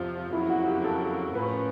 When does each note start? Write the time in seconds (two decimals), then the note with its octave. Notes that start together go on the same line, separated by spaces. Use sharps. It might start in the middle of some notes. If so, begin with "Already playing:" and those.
Already playing: F2 C3 F3 F4
0.33 F2 C#3 F#3 A#3 E4
0.50 F#4
0.67 G4
0.84 A4
1.35 A2 F3 A#3 C#4 B4